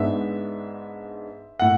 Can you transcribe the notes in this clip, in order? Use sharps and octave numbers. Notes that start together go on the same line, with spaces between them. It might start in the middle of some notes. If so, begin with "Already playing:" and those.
Already playing: G#2 G#3 B3 D4 E5
A2 F#5